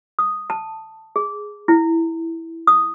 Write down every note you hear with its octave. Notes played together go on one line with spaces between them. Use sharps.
D#6
A5
G#4
E4
D#6